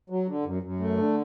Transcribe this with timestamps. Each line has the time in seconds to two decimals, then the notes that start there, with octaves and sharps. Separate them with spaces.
0.10 F#3
0.27 D3
0.45 F#2
0.63 F#2
0.80 A3
0.97 D3